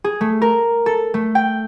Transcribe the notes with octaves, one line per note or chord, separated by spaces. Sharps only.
G#4
A3
A#4
A4
A3
G5